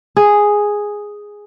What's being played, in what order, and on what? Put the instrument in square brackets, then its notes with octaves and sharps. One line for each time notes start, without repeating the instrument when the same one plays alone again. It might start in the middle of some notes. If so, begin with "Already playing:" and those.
[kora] G#4